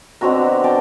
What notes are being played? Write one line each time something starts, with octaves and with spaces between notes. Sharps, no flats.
B2 D3 C4 F#4 A#5
D5 G5 A5